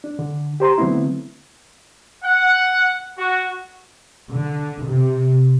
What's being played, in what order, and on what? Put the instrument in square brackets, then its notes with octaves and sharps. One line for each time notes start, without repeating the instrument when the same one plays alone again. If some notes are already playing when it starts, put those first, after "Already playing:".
[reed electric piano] D4
D3
G4 C5 A#5 C6
D3 F#3 A3 B3 C4 E4
[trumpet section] F#5
F#4
[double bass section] D3
C3